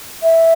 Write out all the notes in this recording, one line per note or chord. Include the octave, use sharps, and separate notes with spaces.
E5